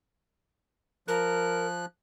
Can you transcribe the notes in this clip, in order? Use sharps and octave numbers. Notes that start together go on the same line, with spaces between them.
F3 A#4 F#6